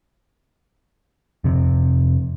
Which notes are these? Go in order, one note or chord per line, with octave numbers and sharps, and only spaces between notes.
F2 C3